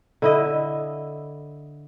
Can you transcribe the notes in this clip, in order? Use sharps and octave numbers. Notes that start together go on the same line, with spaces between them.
D3 E4 D#5